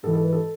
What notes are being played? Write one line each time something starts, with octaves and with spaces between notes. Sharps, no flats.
G#2 E3 A4
A4
B4
A4